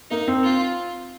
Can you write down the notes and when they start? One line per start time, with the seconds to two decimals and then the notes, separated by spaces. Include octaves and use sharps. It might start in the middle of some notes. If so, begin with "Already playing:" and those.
0.11 A#3 D#4
0.28 C4
0.43 F4